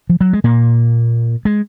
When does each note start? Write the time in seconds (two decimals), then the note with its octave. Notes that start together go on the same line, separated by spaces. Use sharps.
0.09 F3
0.21 F#3
0.33 G#3
0.44 A#2 A#3
1.45 G#3